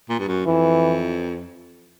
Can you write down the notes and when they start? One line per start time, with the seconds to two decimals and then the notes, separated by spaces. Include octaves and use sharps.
0.10 A#2
0.19 G2
0.28 F#2
0.46 F2 E3